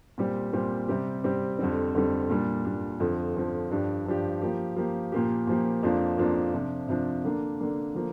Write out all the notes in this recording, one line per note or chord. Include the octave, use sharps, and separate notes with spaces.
A#2 G3 C4 G4
A#2 G3 C4 G4
C3 G3 C4 G4
C3 G3 C4 G4
F2 D3 G3 C4
F2 D3 G3 C4
A#2 G3 D4
A#2 G3 D4
F2 D3 F3
F2 D3 F3
G2 F3 D4 G4
G2 F3 D4 G4
F3 A#3 G4
F3 A#3 G4
A#2 F3 A#3 G4
A#2 F3 A#3 G4
F2 F3 A#3 D4 F4
F2 F3 A#3 D4 F4
C3 F3 D4
C3 F3 D4
D3 A#3 D4
D3 A#3 D4
D3 F3 A#3